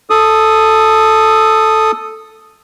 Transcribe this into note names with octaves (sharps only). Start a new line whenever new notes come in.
A4 D#6